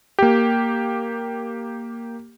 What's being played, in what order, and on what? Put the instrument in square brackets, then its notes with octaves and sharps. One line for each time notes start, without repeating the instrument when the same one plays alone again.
[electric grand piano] A#3 G4